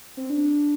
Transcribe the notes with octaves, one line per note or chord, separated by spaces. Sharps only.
C4
D4